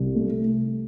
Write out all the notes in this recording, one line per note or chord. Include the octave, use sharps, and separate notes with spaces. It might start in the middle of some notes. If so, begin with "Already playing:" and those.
Already playing: C2
A3